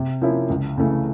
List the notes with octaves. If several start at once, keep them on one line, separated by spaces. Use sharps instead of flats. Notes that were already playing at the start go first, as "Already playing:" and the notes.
Already playing: C3
F3 A#3 C#4 E4
C#2
C#3 E3 A3